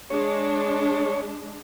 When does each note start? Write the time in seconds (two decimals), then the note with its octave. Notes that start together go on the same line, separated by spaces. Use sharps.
0.10 G#3 D4 C#5